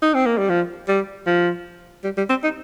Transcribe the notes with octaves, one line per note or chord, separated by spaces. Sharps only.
D#4
C4
A#3
G3
F3
G3
F3
G3
G3
C4
D#4